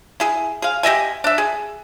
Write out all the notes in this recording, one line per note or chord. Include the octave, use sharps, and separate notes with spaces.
E4 G#4
G#4 F5
G4 D#5 E5 G#5
D4 E5
G#4